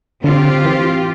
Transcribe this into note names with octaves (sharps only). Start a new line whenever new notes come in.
D3 C4 F4 G4
E3